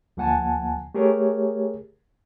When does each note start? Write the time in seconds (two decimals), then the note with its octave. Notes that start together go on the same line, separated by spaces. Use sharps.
0.17 D2 F3 A#3 F#5 G#5 A5
0.95 A3 G4 G#4 A#4 C#5